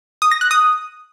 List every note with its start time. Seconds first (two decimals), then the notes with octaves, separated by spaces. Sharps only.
0.22 D#6
0.31 A#6
0.41 F#6
0.51 D#6